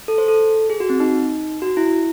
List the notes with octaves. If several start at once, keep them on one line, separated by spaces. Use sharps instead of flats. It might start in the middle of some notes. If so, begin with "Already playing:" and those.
A4
C5
A4
G#4
F#4
C4
D#4
F#4
E4